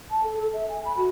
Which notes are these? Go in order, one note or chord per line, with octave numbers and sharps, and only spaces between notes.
A5
A4
A4
E5
G#5
B5
F#4